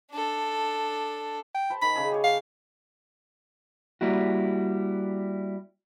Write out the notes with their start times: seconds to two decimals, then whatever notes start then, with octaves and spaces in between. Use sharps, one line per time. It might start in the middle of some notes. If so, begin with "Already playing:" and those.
0.11 D4 A4
1.55 G5
1.70 C5 A5 B5
1.82 D#3 B5
1.95 C#3 G#4
2.12 G4 C#5
2.24 F5
4.01 G3 A#3 E4 F#4